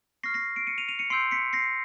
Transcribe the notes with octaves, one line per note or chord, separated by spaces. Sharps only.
C#6 F6 A#6 C7
A#6 C7
C7 D7
C#7 D#7
D#7 F7
D#7 F7
C#7 D#7
C6 E6 G6 C7 D7
B6 C#7
A#6 C7